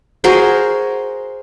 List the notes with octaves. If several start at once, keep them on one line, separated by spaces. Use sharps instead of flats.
F#4 G#4 A#4 C5